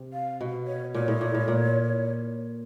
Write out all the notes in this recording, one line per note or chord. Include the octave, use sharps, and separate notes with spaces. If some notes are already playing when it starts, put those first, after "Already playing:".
Already playing: C3
F5
B2
C#5
A#2 C#5
A2
A#2
A2
A#2